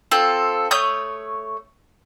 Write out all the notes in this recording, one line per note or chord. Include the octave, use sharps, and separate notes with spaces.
C4 F4 A4
A3 C#5 D#6 G6